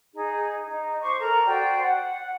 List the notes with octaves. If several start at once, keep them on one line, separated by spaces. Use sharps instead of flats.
D#4 G#4
D#4
C5 C#6 D6
A4 A#4 A#5
F#4 C5 D5 G5
F#5